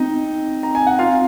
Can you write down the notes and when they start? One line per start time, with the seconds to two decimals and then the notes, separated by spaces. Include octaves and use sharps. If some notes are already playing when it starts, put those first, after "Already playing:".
Already playing: C4 D#4 D#5
0.63 A#5
0.75 G#5
0.87 F#5
0.99 F4 F5